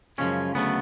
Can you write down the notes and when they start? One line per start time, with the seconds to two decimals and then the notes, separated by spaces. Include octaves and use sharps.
0.18 F#2 C#3 F3 G#3 C#4
0.55 D2 C#3 F#3 A3 B3